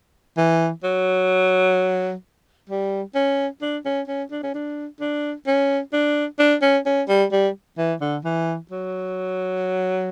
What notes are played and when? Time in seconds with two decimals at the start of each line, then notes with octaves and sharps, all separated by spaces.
0.37 E3
0.84 F#3
2.69 G3
3.15 C#4
3.62 D4
3.85 C#4
4.07 C#4
4.31 D4
4.43 C#4
4.54 D4
5.00 D4
5.47 C#4
5.93 D4
6.39 D4
6.62 C#4
6.86 C#4
7.08 G3
7.32 G3
7.78 E3
8.01 D3
8.24 E3
8.71 F#3